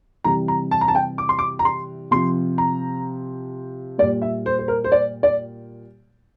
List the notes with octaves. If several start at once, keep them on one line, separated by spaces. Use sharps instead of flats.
C3 E3 G3 A#5
A#5
A5
A#5
A5
G5
D6
C6
D6
A#5
C6
C3 F3 C6
A#5
A#2 G3 D5
E5
C5
C5
A#4
C5
D5
D5